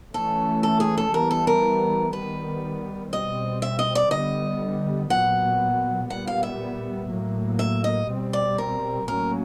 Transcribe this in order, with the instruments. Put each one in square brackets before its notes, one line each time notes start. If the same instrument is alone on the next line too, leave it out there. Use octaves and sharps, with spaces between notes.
[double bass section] E3 A3 C#4 [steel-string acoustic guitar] A4
[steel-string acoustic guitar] A4
G#4
A4
[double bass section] E3 G3 B3 [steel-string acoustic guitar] A#4
[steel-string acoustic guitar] A4
A#4
[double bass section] D#3 G3 B3 [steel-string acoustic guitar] B4
[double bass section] B2 G3 C4 [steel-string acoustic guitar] D#5
[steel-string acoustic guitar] E5
D#5
D5
[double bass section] D3 G3 B3 [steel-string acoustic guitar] D#5
[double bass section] A#2 F#3 B3 [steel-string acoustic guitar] F#5
[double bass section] A#2 G3 B3 [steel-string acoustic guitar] F#5
[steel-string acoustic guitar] F5
E5
[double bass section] A2 F#3 A#3
[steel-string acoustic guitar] E5
D#5
[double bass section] B2 G3 C4
[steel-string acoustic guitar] D5
A#4
[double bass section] A2 F#3 A#3 C#4 [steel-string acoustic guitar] A#4